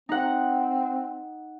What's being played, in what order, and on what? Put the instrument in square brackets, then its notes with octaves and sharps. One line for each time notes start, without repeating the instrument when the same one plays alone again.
[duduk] C4 [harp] D#4 F#5